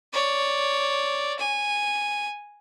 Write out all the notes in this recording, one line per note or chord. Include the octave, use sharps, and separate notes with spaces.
C#5 D5
G#5